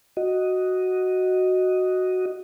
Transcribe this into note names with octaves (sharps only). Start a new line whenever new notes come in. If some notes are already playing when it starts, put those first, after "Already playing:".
F#4 D#5